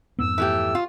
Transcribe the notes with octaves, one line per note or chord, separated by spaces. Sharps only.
F2 G#2 B3 E6
E3 A3 G4
F4